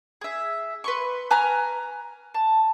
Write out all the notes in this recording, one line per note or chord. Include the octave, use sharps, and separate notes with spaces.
G#4 E5
B4 C6 C#6
B4 G#5 A#5 F6
A5